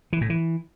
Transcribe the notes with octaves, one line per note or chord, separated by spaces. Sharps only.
E3
A2
E3